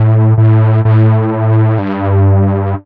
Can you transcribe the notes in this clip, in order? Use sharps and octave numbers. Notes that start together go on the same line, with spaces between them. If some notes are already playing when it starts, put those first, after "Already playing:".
Already playing: A2
A2
A2
G2